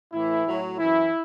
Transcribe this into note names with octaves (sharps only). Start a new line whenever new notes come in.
A2 E3 E4
A2 F#3
F#2 E3 E4